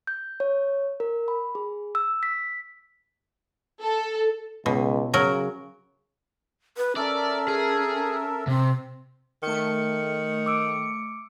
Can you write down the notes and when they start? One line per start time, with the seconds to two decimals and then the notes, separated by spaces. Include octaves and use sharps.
0.07 G6
0.40 C#5
1.00 A#4
1.28 B5
1.55 G#4
1.95 E6
2.23 B6
3.81 A4
4.66 C#2 B2
5.14 C#3 F#3 A#4
6.77 B4
6.96 C#4 A4 A#4 D5 E5
7.48 G#4
8.47 C3 C4
9.43 D#3 A3 C#7
10.46 D6 E6 D7